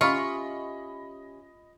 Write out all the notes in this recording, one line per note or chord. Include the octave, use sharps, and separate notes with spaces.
C#4 F4 G4 D#5 E5 B5 C#6